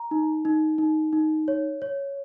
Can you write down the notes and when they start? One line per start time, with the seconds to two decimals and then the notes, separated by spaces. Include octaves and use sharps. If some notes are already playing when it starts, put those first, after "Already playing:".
Already playing: A#5
0.11 D#4
0.45 D#4
0.78 D#4
1.13 D#4
1.48 C#5
1.82 C#5